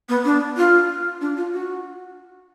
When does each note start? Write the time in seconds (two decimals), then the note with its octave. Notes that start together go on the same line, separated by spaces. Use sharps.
0.09 B3
0.25 D4
0.57 F4
1.21 D4
1.37 F4
1.52 F#4